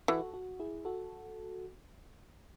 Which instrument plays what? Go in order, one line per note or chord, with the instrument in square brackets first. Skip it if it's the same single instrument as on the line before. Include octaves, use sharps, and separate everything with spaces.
[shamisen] E3 [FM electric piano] F#4 A4
[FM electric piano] F#4
E4 G#4
F#4 A4